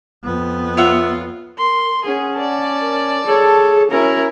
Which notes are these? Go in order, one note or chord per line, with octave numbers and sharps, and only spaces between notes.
F2 B3
F4 C#5 E5 F#5
A#4 C6
C#4 G#4 F#5
D5 A5
A#4
G#4 A4 C#5
C#4 E4 F#4 A#4 A#5